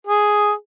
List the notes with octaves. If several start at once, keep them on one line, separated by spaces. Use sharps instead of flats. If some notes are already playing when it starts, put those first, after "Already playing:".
G#4